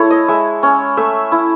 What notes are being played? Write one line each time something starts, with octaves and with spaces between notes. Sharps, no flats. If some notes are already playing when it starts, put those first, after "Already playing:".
Already playing: G#3 E4 A4 C#5
D#5
G#3 E5
C#4
A3 E5
E4